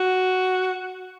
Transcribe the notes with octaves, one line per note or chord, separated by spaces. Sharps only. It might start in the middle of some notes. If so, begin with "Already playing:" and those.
Already playing: F#4